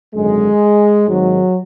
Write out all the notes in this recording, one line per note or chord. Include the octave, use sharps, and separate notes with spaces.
G#1 F#2 D3 G#3
G#1 G#2 D#3 F#3